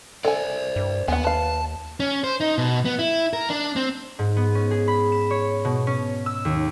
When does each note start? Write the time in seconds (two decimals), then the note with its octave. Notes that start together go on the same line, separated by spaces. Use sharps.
0.25 A4 C5 D5 G#5
0.76 G2
1.08 D#2 B3 F#5 G#5
1.24 B4 F5 A5
2.00 C#4
2.24 C5
2.40 D#4
2.58 B2
2.85 B3
2.99 E4
3.33 A#4
3.50 D4
3.76 C4
4.19 G#2
4.36 B3
4.55 C#4
4.71 G#4
4.88 B5
5.12 E7
5.31 C#5
5.65 B2
5.87 C#4
6.26 E6
6.45 D#2